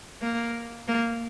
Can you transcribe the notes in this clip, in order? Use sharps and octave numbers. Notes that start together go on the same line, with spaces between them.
A#3
A#3